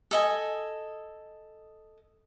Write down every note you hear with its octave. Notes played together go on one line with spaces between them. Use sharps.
A4 D#5 G#5